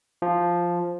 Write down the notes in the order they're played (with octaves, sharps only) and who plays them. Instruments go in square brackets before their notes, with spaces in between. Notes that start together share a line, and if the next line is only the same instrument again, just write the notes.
[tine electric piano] F3